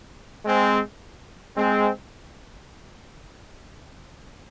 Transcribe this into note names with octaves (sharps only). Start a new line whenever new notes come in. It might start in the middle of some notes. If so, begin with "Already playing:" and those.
G#3 C4
G#3 C4